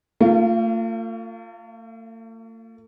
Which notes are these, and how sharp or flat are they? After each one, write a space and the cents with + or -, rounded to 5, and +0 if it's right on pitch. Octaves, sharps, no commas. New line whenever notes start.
A3 +45 F4 +0 F5 -40